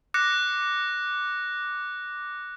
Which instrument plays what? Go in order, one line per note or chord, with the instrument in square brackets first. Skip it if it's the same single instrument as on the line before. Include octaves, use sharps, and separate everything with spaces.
[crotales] D6 F#6 A#6 C#7